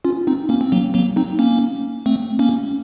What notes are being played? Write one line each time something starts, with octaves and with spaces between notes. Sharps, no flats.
C#4 F4
C4 D#4
A#3 C#4
C4
F#3 A#3
F#3 A#3
C4 D#4
A#3 C#4
A3 C4
A#3 C#4